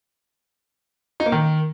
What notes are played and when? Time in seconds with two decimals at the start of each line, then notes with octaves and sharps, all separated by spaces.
1.20 D#4
1.26 A#3
1.32 D#3